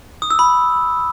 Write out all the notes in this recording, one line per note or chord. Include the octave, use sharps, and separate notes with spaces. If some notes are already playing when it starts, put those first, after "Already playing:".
D#6
E6
B5